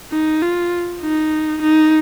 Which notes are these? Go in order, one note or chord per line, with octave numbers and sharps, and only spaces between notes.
D#4
F4
D#4
D#4